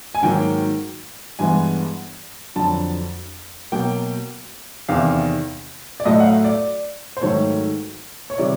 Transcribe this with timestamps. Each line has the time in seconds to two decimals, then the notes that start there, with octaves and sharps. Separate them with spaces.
0.15 G#5
0.22 G#2 D#3 F#3 A#3 G5
1.39 G2 E3 G#3 B3 G#5
2.56 F2 D3 F#3 A5
3.72 B2 F#3 A#3 G5
4.89 E2 C3 D#3 F5
6.00 D5
6.05 A2 F#3 A3 D#5
6.20 F#5
6.24 F5
6.44 D5
7.17 C5
7.22 G#2 D#3 F#3 A3 C#5
8.30 C#5
8.38 C3 D#3 G3 D5